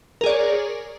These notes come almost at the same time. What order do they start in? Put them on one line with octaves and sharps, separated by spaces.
A#4 G#4 D5 C#5